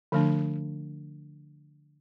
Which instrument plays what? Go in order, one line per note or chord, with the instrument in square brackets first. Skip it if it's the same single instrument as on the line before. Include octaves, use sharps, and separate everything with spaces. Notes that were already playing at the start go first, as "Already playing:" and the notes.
[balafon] D3 F3 A3 D4